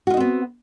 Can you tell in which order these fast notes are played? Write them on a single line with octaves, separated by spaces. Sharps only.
F#4 F4 D#4 C4 B3